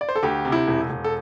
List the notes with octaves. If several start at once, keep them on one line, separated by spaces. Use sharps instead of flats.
D5
C5
A4
D2 G4
C3
E4
E1
E1
A4